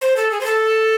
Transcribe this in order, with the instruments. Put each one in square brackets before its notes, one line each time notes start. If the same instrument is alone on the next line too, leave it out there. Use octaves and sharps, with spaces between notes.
[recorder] C5
A4
G#4
C5
A4